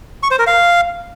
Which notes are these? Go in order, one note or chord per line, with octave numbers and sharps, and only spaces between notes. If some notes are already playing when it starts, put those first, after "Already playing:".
C#6
C5
A#4
F5